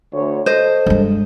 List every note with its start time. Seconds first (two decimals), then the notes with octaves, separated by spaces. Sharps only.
0.12 D2 C#5
0.46 A4 C5 D#5
0.86 G2 G#3